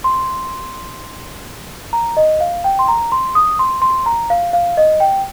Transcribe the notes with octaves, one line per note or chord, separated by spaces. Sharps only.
C6
A#5
D#5
F5
G5
C6
A#5
C6
D#6
C6
C6
A#5
F5
F5
D#5
G5